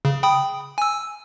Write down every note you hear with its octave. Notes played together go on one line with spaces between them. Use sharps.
C#3
G5 B5 D#6
G#5 E6